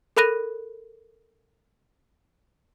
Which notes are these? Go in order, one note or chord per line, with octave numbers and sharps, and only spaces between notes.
A4 A#4 B5 F#6 A#6 D#7